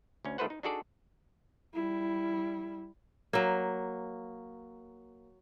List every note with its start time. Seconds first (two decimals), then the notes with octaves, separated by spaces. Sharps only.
0.25 D2 C#4
0.38 D#3 A3 F4 B4 C5 F#5
0.50 D#4
0.63 D4 D#4 F#4 G#4 A4 D5
1.74 G3 E4
3.33 F#3 A#3